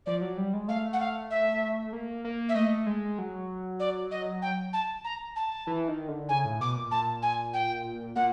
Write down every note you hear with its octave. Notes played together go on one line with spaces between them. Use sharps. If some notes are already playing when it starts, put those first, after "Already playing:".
F3 D5
F#3
G3
G#3
A3 F5
F#5
F5
E5
A#3
A#3
E5
A3 D#5
G#3
F#3
D5
D#5
G5
A5
A#5
A5
E3
D#3
D3
C#3 G#5
A2
B2 D6
A#2
A#2 A5
G#5
G5
A#2 F#5